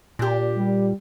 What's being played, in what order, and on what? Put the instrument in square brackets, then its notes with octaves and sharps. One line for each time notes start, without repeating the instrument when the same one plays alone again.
[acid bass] A#2 [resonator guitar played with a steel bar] D4 G4
[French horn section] G3